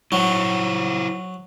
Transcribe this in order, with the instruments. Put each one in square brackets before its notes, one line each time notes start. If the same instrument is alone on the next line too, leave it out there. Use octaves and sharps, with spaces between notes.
[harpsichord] F#3 [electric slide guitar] E4 C5 F#5